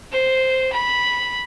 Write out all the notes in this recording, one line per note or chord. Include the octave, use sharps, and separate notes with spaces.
C5
B5